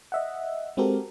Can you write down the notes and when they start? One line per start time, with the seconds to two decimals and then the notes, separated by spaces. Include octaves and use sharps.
0.12 D#5 E5 F#5
0.77 G#3 C4 F#4 G4 A4 A#4